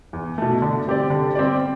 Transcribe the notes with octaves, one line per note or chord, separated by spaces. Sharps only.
E2
B2 A3
D3
G3 C4 G4 D5
D3
G3 C4 G4 D5